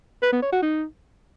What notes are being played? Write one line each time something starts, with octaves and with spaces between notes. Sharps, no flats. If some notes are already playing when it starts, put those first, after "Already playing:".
B4
B3
C#5
F#4
D#4